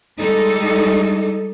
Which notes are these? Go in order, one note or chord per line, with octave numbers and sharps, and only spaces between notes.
G3 G#3 D#4 A4